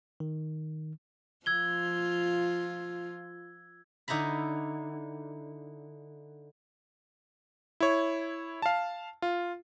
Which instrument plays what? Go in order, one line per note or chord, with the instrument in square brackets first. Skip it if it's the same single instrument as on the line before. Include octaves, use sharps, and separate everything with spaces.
[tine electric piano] D#3
[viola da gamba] F3 F4 [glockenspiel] E6 G#6 G7
[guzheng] D3 D#4 E4 A#5 B5
[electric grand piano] E4 C#5
F5 A5
F4